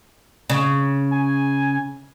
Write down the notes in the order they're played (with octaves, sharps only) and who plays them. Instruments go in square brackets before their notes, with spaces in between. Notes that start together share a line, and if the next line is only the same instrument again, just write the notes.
[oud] C#3
[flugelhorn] G#5